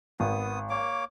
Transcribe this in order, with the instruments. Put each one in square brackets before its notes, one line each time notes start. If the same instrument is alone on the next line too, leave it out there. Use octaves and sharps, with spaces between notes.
[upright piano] G#1 [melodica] B3 D#6
[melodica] A#3 C#5 D6